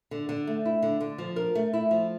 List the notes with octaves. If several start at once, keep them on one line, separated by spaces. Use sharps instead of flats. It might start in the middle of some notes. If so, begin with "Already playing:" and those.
D3
D3
A3
E4
D3
D3
F3
A#4
A3
E4
F3